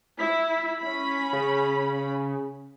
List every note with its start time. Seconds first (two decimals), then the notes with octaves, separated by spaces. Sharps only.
0.19 E4 B6
0.79 C#4 B5
1.33 C#3